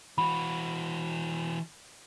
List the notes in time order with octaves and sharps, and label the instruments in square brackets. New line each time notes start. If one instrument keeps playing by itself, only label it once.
[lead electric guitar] E3 F#4 [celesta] B5